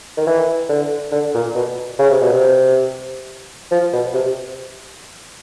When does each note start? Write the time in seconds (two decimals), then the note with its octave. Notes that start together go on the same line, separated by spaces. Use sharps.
0.17 D#3
0.27 E3
0.69 D3
1.12 D3
1.35 A#2
1.55 B2
1.99 C#3
2.11 C3
2.21 B2
2.33 C3
3.72 F3
3.93 B2
4.14 C3